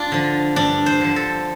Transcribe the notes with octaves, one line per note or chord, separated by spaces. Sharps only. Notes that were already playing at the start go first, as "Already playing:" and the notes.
Already playing: D4 F4
D3 F3
G2 D4
C5
D3 F3
A4